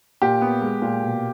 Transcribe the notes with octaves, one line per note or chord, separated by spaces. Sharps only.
A#2 G4
B3
G#3
A#2
B2